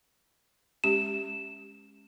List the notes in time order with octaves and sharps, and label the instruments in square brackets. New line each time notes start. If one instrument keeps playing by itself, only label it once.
[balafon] G#3 C#4 G4 [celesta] E7